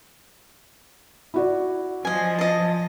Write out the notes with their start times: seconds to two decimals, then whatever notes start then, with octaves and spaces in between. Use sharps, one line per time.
1.34 E4 F#4 D5
2.05 F3 D#5 G#5
2.39 D#5 A5